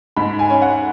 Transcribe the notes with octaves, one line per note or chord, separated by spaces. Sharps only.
G#2 B5
G#5
C#4
F#5